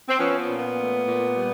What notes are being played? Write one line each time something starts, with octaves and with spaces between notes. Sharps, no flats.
C4
F3 B3 C#4
B3
A#2
B3
A3
A#2
G3